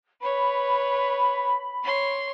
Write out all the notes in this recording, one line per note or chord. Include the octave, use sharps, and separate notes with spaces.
B4 C#5 B5
C#5 C6